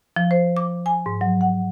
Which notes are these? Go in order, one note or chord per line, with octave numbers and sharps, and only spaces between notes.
F3
C5
D6
G#5
G#2
F#3
F#5